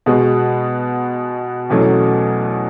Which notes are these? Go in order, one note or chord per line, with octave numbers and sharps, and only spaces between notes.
B2 G#3 B3 F#4
E2 B2 F#3 A3 C#4